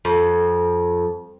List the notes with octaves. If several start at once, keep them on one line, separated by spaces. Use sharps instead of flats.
F2